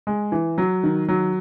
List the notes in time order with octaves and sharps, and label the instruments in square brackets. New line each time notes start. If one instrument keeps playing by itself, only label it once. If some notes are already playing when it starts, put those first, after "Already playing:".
[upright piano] G#3
E3
F#3
D#3
F#3